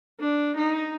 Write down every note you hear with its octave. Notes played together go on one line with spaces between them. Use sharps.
D4
D#4